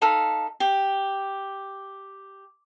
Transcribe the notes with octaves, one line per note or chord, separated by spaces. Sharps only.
D#4 A4 F5 B5
G4